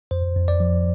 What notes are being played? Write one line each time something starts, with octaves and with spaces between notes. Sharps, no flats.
F2 C5
F2
D5
F3